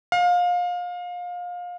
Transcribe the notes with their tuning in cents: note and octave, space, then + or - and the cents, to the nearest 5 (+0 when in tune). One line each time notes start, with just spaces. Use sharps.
F5 +25